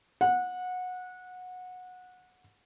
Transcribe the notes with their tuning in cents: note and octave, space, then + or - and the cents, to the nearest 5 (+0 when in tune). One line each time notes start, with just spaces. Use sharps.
F#5 -20